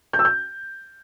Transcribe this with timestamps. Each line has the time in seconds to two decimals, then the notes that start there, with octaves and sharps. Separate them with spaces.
0.13 G6
0.19 E6
0.25 G6